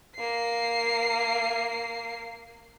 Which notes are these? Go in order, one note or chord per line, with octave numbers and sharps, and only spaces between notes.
A#3 C7